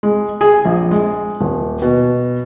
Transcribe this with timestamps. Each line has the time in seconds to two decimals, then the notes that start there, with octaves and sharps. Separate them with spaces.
0.03 G#3
0.41 G#4
0.65 A#1
0.91 G#3
1.41 D#1
1.82 B2